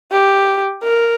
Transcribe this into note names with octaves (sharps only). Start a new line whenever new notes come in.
G4
A#4